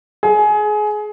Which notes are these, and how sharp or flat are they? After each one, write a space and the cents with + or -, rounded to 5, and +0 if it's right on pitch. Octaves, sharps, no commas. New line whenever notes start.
G#4 +25